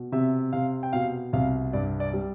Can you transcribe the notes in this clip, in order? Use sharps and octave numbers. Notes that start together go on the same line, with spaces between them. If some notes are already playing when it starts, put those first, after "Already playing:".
Already playing: B2
C3 E5
C3 F5
G5
B2 F5
C2 F5
G2 D5
D5
G3